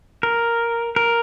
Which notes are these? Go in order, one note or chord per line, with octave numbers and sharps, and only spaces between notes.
A#4
A#4